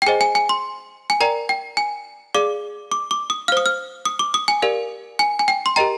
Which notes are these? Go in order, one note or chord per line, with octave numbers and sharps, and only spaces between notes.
G5
G#4 C5 D#5 G#5
G#5
G#5
C6
G#5
A#4 D5 G5 A#5
G5
G#5
G#4 D5 F5 D6
D6
D6
D#6
C5 F5 D#6 F6
F6
D#6
D6
D#6
G#5
G4 A#4 D5 F5
G#5
G#5
G5
C6
G4 A#4 D#5 G5 A#5